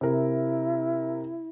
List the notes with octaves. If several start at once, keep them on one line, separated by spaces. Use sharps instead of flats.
C3 E4 A#4